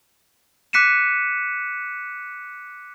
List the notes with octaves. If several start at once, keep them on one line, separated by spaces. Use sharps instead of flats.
D6 F#6 B6 C#7 D#7 E7